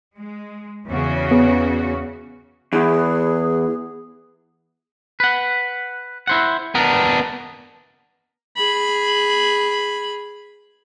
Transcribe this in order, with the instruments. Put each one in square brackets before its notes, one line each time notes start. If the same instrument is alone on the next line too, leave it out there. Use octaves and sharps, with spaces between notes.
[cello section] G#3
E2 C#3 F#4
[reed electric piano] B3 G#4
[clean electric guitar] E2 [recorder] G#4
[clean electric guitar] B4 F#5
E4 C5 F#5
[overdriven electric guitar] B3 D4 [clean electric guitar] A#4
[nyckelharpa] G#4 B5